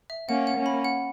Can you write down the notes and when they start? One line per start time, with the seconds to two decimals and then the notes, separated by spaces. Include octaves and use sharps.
0.10 E5
0.29 A#3 C#4 F#5
0.47 F#5
0.57 A#3 C#4
0.66 B5
0.85 F#5